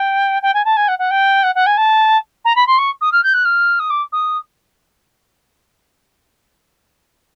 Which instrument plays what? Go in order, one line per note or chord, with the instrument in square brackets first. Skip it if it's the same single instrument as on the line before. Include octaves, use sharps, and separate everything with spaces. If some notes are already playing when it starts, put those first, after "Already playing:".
Already playing: [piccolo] G5
G5
G#5
A5
G#5
F#5
F#5
G5
F#5
F#5
G#5
A5
A#5
B5
C6
C#6
D#6
F6
G6
F#6
F6
D#6
D6
D#6